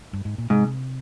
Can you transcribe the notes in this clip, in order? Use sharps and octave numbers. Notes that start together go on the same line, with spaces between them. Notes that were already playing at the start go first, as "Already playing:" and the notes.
G2
G#2
A#2
G#2 C3